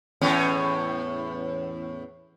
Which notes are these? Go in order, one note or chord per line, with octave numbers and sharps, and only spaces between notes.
E2 A2 C#4